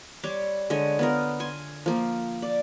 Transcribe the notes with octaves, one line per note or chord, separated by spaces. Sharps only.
G3 C#5 C6 D6
D3 G#3 C#5 D#5
B3 F4 A#4
G#5 C6
F3 A#3
D5